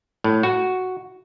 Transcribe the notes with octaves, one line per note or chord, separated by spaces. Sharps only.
A2
F#4